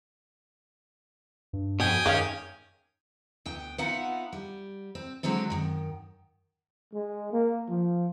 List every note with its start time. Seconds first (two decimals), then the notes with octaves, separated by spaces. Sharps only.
1.53 G2
1.80 F2 B2 G5 G#5 D#6
2.06 F#2 D#3 G#3 C#4 F5
3.46 D2 B3 G5
3.78 B3 D#4 F4 E5 F#5
4.32 G3
4.95 C4
5.23 D3 F#3 G#3 C4 A4
5.50 F#2 D#3
6.94 G#3
7.32 A#3
7.70 F3